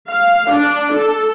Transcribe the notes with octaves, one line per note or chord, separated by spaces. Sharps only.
F5
D4
A4